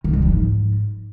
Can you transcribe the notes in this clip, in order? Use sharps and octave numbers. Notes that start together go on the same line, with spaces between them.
D#3
G3
F3
G#2